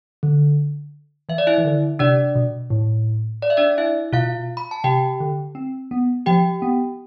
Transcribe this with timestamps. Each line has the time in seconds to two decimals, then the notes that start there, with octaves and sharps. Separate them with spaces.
0.23 D3
1.29 E3 E5
1.38 D5
1.47 E4 E5
1.58 E3
1.65 D3
1.99 C3 D4 D5
2.35 B2
2.70 A2
3.42 D5
3.50 E5
3.57 D4 D5
3.78 E4 E5
4.13 B2 F4 F5
4.57 B5
4.71 A5
4.84 C3 G4 G5
5.20 D3
5.55 C4
5.91 B3
6.26 F3 G4 G5
6.62 B3